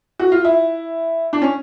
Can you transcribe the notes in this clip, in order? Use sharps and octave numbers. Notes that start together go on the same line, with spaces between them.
F#4
F4
E4
D4
C#4